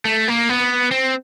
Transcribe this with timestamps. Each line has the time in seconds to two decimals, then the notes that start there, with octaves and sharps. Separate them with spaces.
0.06 A3
0.28 A#3
0.50 B3
0.92 C4